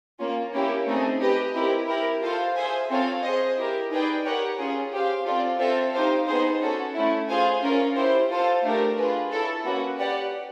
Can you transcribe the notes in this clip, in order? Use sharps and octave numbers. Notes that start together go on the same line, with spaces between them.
A#3 C#4 F4
A#3 C#4 E4 G4
A3 C4 D#4 G#4
G4 B4 D#5
C4 E4 G4 A#4
E4 G4 A#4
F4 A4 C5 F5
G#4 C5 E5 G#5
C4 F4 A4 C#5 F5
G#4 C5 D#5
E4 G4 A#4
D#4 G#4 B4 D5 G5
G4 A#4 C#5 F#5
C#4 F4 G#4
G4 C5 F5
C4 F4 A4 D5
C4 F4 A4 C5 E5
D#4 G4 C5 F5
B3 D#4 G#4 C5
C#4 F#4 A4
A3 C#4 E4
F4 G#4 C5 F5 G#5
C#4 F4 A#4
E4 G4 C5
F4 A4 C5 F5 A5
A3 D4 G4 A#4
F4 G#4 B4
E4 A4 C#5
A#3 C#4 F#4 B4
G4 B4 D5 F#5